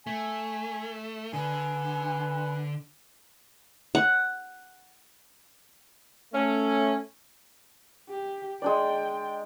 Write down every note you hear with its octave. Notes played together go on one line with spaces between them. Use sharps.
A3 G#5
D3 B4 G#5
F#5
A3 C#4
G4
G#3 D4 D5 G5